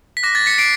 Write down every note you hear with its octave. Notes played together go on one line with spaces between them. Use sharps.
B6
D6 F#6 A#6
A6
B6 C#7
D6 C7 D7